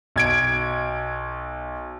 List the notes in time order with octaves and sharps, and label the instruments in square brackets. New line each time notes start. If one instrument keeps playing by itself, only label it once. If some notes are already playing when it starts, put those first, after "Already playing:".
[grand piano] B1 G#6 D7